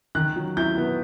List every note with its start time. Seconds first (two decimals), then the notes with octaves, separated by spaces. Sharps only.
0.15 D#3 F#6
0.36 F#3
0.57 E4 G6
0.78 B3